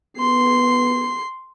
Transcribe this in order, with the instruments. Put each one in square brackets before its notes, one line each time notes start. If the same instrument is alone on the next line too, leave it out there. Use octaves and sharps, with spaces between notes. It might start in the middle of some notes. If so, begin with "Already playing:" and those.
[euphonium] B3 [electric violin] C6 C7